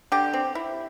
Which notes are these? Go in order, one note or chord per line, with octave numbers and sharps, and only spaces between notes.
D3 G4
C4
E4